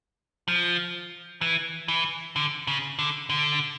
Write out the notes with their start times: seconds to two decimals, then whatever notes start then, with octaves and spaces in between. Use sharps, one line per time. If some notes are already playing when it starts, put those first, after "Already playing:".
0.48 F3
1.41 E3
1.88 E3
2.36 D3
2.67 C#3
2.99 D3
3.30 D3